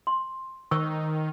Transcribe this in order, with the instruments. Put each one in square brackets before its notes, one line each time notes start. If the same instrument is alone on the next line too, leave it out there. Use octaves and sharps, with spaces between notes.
[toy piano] C6
[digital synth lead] D#3 [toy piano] C5 C#6 E6